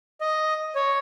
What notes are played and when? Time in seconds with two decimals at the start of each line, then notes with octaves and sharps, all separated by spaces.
0.21 D#5
0.75 C#5